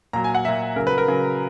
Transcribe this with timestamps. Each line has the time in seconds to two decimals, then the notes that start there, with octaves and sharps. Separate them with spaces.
0.13 A#2 F#3 A#5
0.24 G#5
0.35 F#5
0.45 A#2 F#3 E5
0.76 C#3 F#3 A#4
0.87 B4
0.98 A#4
1.08 C#3 F#3